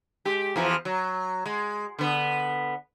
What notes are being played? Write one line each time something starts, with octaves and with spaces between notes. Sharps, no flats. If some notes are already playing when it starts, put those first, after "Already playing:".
G#3 G4
E2 E3 F3
F#3
G#3
D3 B3